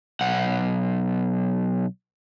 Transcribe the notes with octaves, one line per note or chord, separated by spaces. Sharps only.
B1 F#5